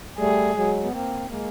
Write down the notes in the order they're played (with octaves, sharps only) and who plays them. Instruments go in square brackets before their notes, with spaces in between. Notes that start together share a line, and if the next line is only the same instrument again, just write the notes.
[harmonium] G3 A3 [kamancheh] G#4
[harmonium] F#3 G#3
B3
A#3 C4
G#3 A#3